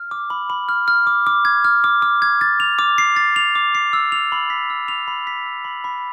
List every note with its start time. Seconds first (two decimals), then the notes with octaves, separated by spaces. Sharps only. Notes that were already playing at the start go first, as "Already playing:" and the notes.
Already playing: F6
0.11 D6
0.30 B5
0.50 B5
0.69 F6
0.88 F6
1.07 D6
1.27 D6
1.45 G#6
1.64 F6
1.84 D6
2.02 D6
2.22 G#6
2.41 A6
2.60 F7
2.79 D6
2.98 C7
3.16 A6
3.36 F7
3.55 D6
3.75 C7
3.93 E6
4.12 F7
4.32 B5
4.50 B6
4.70 E6
4.88 F7
5.08 B5
5.27 B6
5.46 E6
5.65 B5
5.84 B5